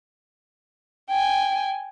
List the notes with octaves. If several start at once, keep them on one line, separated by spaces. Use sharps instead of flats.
G5 G#5